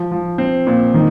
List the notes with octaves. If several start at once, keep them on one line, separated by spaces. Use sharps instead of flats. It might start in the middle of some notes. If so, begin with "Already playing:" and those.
Already playing: F3
F3
C4
A#2
D#3